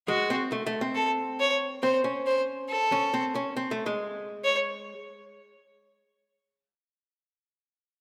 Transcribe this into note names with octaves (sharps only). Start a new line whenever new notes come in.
G#3 F#4
C4
A3
A3
C4
A4
C#5
C4 C5
C#4
C5
A4
C#4
C4
C#4
C4
A3
G#3
C#5